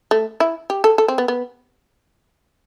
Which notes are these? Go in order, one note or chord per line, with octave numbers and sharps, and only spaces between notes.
A3
E4
G4
A4
A4
C4
B3
B3